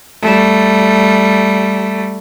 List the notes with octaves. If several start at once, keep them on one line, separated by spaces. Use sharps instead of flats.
G3 A3